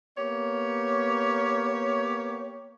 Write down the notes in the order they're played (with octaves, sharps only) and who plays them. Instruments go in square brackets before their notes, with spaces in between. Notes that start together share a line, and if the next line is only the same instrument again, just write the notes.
[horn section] A#3 B3 G4 C#5